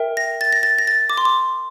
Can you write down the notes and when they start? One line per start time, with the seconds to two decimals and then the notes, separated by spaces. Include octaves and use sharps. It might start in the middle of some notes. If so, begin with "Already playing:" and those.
Already playing: A#4 E5 G5
0.17 A#6
0.41 A6
0.53 A#6
0.63 A6
0.78 A#6
0.87 A6
1.10 D6
1.17 C6
1.25 D6